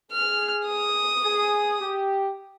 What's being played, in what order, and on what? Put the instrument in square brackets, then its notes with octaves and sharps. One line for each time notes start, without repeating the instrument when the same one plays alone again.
[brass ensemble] G#4 [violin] F6
[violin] D#6
[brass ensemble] G#4
G4